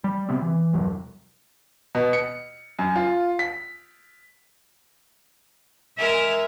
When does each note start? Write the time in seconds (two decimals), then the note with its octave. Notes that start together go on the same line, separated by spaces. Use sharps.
0.04 G3
0.29 C3 B3 C4
0.42 E3
0.73 E1 C2 G2 F#3
1.95 B2
2.13 C#7
2.79 F#2
2.96 F4
3.39 B6
5.98 G#3 A#4 E5